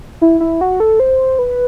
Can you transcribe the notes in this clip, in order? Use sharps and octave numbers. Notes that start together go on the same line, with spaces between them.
E4
E4
F#4
A4
C5
B4